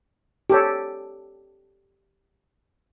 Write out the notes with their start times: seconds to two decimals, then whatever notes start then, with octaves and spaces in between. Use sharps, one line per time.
0.50 G4 A4 C#5